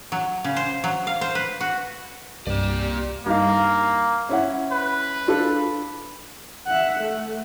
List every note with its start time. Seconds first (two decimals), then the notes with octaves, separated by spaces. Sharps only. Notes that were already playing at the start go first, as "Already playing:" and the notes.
0.12 F#3
0.44 C#3
0.56 C5
0.84 F#3
1.07 F5
1.21 C5
1.35 B4
1.61 F#4
2.47 C2 G2 G3 A#3 C4 G4 D5
3.26 G2 A#3 D#4 F5
4.29 C#4 E4 F#5
4.72 B4
5.27 D4 F4 A4
6.67 E5 F#5
7.01 A3